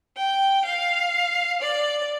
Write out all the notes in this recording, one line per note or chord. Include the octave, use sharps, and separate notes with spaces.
G5
F5
D5